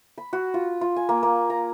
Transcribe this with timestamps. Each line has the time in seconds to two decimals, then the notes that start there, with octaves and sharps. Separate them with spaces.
0.18 B5
0.33 F#4
0.54 F4
0.81 F4
0.96 G#5
1.09 A#3
1.23 A#3
1.50 A#5